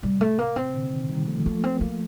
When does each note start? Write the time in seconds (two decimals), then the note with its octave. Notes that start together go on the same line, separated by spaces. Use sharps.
0.03 A2 C3 G3
0.21 A3
0.38 A#3
0.56 C4
0.70 C3
0.74 A#2 D3
0.91 C3 D#3
1.09 D#3 G3
1.28 F3 A3
1.46 F3 A3 A#3
1.64 C4
1.81 A#3